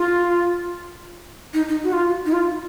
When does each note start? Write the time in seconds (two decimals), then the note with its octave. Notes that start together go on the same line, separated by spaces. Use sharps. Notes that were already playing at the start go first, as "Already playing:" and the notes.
Already playing: F4
1.54 D#4
1.69 D#4
1.84 F#4
1.93 F4
2.26 D#4
2.32 F4